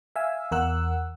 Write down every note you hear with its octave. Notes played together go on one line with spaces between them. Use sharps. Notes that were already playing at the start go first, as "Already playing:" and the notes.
E5 F5 G#5 E6
E2 A#4 F#5 E6 F#6